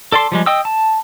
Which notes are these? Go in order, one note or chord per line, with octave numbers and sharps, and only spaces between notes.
A4 D5 A5 C6
F3 G3 G#3
D#5 G5 D#6 E6
A5